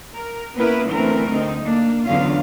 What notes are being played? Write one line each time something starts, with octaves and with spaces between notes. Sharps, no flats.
A#4
A#3 B3 C#4 E4 A#4 B4
D3 E3 A3 C4 C#4 A#4
D2 D3 C4 D#4
A#3 D4
E2 D3 F#3 C#4 F4 F5